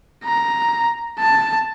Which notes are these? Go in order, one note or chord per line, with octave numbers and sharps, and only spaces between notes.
A#5
A5